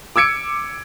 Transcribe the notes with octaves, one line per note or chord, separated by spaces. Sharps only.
D6 E6 G#6 C#7 D7